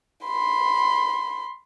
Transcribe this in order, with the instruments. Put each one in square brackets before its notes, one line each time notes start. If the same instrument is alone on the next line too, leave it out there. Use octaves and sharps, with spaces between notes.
[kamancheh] B5 C6